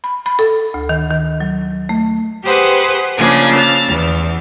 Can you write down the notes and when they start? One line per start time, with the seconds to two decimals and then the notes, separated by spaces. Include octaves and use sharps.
0.04 B5
0.26 B5
0.39 A4
0.74 D2
0.89 D#3
1.10 D#3
1.40 F#3
1.89 A3
2.44 G4 G#4 B4 C5 F#5
3.16 C#3 F3 A#3 D4 G#4 G#6
3.54 E6 F6 A6
3.86 E2